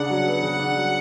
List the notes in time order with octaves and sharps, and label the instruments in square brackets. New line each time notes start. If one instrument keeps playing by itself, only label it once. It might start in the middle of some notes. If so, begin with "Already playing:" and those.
Already playing: [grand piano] C#3 D4 [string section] F#5
[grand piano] F#3
B3
C#3
D4
F#3